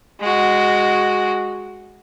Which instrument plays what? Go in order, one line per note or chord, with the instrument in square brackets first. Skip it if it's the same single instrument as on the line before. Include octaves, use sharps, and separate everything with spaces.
[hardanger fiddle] G#3 F#4